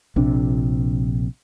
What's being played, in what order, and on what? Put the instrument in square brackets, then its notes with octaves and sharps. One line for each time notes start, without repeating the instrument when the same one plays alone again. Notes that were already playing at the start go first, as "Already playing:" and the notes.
[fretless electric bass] A#1 C3 D4